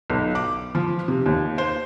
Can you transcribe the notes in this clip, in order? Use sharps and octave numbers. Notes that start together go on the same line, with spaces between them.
B1
D6
F3
C3
D#2
C5